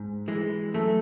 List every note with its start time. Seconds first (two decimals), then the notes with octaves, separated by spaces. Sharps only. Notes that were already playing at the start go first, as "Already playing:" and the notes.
Already playing: G#2
0.28 E3 G#3
0.74 F#2 A3